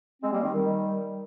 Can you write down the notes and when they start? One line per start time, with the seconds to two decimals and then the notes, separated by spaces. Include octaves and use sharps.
0.22 G#3 C4
0.32 G3 A#3
0.43 D#3 G3
0.54 D#3 G3